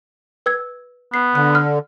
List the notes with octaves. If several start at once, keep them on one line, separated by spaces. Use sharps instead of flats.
B4 E6 G#6
B3 C7
D3 F#6
F6